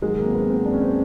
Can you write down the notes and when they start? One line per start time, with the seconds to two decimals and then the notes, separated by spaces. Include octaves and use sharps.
0.02 G#2 D#3 F#3 G#3
0.18 A#3
0.26 C4
0.34 B3
0.49 C4
0.65 D4
0.73 C#4
0.81 C4